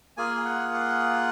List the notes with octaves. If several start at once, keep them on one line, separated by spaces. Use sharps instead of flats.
A#3 F4 G#4 G#5
F#5
F#5